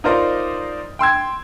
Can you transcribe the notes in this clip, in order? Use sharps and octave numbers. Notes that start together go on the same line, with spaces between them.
D#4 F4 A#4 C5 D5 D#5
G5 C6 E6 G#6